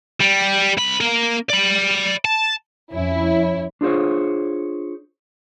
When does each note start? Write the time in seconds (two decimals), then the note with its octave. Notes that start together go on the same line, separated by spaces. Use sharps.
0.21 G3
0.78 C2 B5
1.01 A#3 A#4
1.50 D5 B5
2.25 A5
2.93 F2 C#4 E4
3.81 D4 F4 G#4 C5 C#5